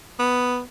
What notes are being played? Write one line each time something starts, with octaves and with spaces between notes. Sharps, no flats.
B3